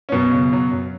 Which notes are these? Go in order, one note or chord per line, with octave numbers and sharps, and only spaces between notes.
C#4
F#2 B2 B3
C#3
F#3
F#2